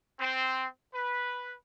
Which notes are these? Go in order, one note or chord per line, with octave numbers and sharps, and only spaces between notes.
C4
B4